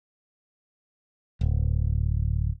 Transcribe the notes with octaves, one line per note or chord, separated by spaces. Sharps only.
D1